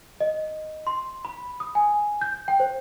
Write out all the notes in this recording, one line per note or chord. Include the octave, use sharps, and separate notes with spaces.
D#5
C6
B5
D#6
G#5
G6
G5
C5